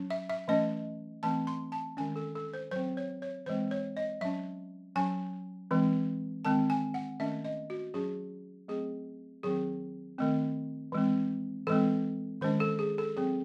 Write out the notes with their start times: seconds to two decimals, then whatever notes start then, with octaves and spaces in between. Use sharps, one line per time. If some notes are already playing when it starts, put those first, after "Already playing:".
Already playing: F#3 C#4
0.10 E5
0.30 E5
0.48 E3 A3 C#4 D#5
1.23 E3 A3 C4 A5
1.47 C6
1.72 A5
1.97 D#3 G#3 C#4 G#5
2.16 A4
2.35 A4
2.54 C5
2.71 F#3 C4 C5
2.97 C#5
3.22 C#5
3.46 E3 G#3 C4 C5
3.71 C#5
3.97 D#5
4.21 F#3 C#4 E5
4.96 F#3 C#4 G#5
5.71 E3 G#3 C4
6.45 D#3 G#3 C4 A5
6.70 G#5
6.94 F#5
7.19 D#3 A3 C#4 E5
7.44 D#5
7.70 F#4
7.94 F#3 C#4 G#4
8.68 F#3 A3 C4 G#4
9.43 D#3 F#3 C4 G#4
10.19 D#3 A3 C4
10.92 E3 G#3 C4
11.67 E3 G#3 C4 A4
12.41 D#3 G#3 C#4 C5
12.60 A4
12.79 G#4
12.98 A4
13.16 F#3 C4 G#4